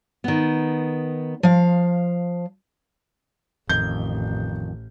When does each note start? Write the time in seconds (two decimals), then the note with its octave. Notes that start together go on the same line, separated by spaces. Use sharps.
0.24 D#3 B3
1.43 F3 F5
3.69 A1 F2 D#3 G6